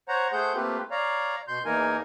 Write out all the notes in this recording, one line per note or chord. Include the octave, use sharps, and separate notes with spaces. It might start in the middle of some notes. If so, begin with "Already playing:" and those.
C5 C#5 F#5 A#5
A3 G#4 C5 F#5 G6
A3 A#3 C4 F4 G4 B4
C#5 D5 F5 A#5
B2 C6 G6
E2 E3 A#3 D#4 A#4 G#5